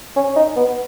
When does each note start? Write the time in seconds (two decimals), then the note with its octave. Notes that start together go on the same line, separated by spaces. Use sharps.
0.16 C#4
0.36 D#4
0.56 B3